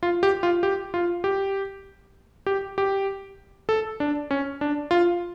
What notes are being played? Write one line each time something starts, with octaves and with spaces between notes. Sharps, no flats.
F4
G4
F4
G4
F4
G4
G4
G4
A4
D4
C#4
D4
F4